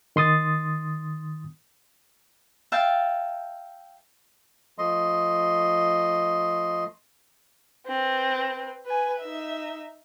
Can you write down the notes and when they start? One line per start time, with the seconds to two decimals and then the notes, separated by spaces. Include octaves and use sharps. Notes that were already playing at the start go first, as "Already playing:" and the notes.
0.16 D#3 C6 D#6 A6
2.72 E5 F5 G5 A5
4.78 F3 A3 D#5 C6
7.87 C4 B4
8.86 B4 G#5
9.20 D#4 E5